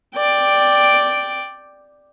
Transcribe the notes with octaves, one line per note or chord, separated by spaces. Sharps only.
D5 G5